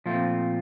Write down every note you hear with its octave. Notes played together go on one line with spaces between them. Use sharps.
A#2 F3 A3 C4 F4